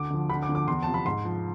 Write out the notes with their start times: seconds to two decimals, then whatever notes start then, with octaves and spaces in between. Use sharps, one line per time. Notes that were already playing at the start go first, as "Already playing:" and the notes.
Already playing: D2 D6
0.10 D3 F3
0.29 D2 B5
0.42 D6
0.49 D3 F3
0.55 D6
0.67 E2 C6
0.83 C3 F3 A5
0.94 B5
1.06 G#2 C6
1.25 F3